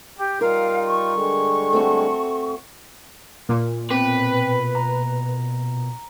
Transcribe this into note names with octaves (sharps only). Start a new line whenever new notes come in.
G4
G3 D#4 F4 A#4 F5
C#6
D3 G3 G#3
A3 C4 F#4
A#2
B2 C4 B4
A#5